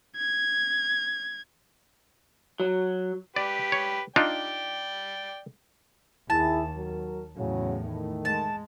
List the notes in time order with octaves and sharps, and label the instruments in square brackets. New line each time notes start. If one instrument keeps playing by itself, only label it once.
[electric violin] G#6
[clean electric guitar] F#3
[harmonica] G4 B4 [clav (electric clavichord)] D5
[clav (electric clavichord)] C#5
[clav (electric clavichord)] D4 D#4 F4 [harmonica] D5 G5
[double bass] D#2 [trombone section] E4 G#4 [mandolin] A5
[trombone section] F#3 A#4
[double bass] E2 A2 [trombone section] C#3 F#3
[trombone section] D#3 A3
[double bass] G#3 [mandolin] A5